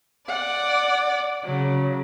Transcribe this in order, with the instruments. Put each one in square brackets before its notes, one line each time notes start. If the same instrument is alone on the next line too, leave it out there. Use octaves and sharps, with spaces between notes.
[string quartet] D5 [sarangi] F#5
[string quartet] C#3 [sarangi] F#3